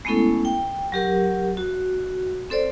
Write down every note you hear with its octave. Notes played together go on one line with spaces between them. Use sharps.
G#3 A3 B3 C#4 E4 A4
G5
F#3 G4 A#4
F#4
C4 A4 C5 D5